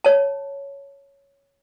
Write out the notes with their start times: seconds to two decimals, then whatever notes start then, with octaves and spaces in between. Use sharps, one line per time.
0.04 C#5 A5